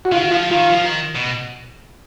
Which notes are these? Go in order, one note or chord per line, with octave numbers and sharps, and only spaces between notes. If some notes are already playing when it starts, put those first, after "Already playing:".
F#4
D#3 F4
F3 F4
D#3 F4
F3
D#3
B2